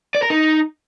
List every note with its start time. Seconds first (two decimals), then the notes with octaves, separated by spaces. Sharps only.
0.15 D5
0.22 A#4
0.30 D#4